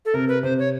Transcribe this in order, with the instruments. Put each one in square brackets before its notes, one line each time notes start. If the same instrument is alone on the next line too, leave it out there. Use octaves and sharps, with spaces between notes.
[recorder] A4
[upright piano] C3 [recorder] A#4
[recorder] B4
[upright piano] C3 [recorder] C5
[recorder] C#5